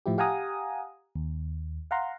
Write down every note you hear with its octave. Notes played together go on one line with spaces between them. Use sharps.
A2 F3 E4 G4
G4 F5 F#5 G#5 A#5 D#6
D#2
F5 F#5 A#5 C6